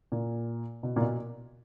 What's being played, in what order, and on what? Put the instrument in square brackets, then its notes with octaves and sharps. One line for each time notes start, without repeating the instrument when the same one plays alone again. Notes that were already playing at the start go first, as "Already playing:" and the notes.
[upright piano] A#2
B2
A#2
B2